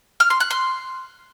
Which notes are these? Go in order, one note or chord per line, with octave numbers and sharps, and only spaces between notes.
F6
C6
F#6
C6